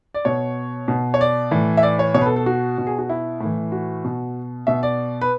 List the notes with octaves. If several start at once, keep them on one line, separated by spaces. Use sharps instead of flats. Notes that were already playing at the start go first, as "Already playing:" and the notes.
D5
B2 C#5
B2
C#5
D5
A2 E3
E5
D5
C#5
B2 C#5
B4
A4
A4
F#4
B2
G#4
F#4
E4
A2 E3
F#4
B2
B2 E5
D5
B4